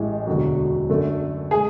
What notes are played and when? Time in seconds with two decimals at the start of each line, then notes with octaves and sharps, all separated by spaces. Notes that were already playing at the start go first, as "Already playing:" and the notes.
Already playing: A1 A2 G#3
0.27 E1 D2 D3 F#3
0.89 F#2 D3 A3
1.51 G#3 G#4